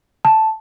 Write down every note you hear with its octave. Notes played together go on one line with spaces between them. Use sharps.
A5